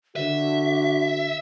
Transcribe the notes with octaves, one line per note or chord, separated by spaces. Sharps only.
D3 F#4 E5